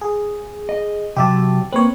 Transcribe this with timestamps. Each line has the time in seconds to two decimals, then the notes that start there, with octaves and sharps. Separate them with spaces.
0.01 G#4
0.69 D#5
1.16 C3 F#3 G4 E5 A5
1.73 A#3 C4 B4 C#5